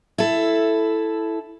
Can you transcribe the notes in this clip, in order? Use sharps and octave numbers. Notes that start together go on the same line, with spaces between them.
E4 A4